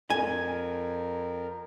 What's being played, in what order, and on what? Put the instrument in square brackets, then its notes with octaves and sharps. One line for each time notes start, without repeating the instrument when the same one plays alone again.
[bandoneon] F2 [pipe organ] A#4 [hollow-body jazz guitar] G#5